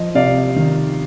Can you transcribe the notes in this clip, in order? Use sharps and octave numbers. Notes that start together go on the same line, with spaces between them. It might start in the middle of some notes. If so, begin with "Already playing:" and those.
Already playing: F3 D#5
C3 D5 F5
D#3